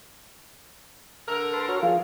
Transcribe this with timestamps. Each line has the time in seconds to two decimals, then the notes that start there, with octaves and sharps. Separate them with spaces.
1.28 D3 A4 A#4
1.53 B4 A5 C6
1.68 F#4 C#5 F6
1.83 F3 F4 G#4 F5